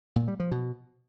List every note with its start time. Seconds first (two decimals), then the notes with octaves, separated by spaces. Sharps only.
0.16 A#2
0.28 G3
0.40 F3
0.51 B2